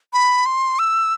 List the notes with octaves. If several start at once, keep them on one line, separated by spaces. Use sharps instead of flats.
B5
C6
E6